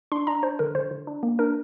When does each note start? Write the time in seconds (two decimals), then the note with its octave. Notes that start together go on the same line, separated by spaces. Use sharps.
0.12 D4 C6
0.27 D4 A#5
0.43 D4 C5
0.59 D3 A#4
0.75 D3 C5
0.91 D3
1.07 D4
1.23 A#3
1.39 D4 A#4